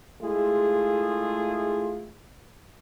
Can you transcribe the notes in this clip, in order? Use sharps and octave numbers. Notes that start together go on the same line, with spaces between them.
G#3 A3 E4 F4 G#4